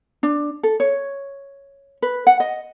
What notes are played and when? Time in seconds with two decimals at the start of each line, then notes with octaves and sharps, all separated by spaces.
0.23 D4
0.63 A4
0.80 C#5
2.02 B4
2.27 F#5
2.40 D#5